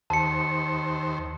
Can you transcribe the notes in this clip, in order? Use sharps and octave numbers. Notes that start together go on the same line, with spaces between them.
D#2 C5 A5 C#7